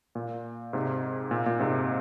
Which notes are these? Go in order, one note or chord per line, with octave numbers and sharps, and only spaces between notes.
A#2
G#2 C3
A#2
A#2
G#2 C3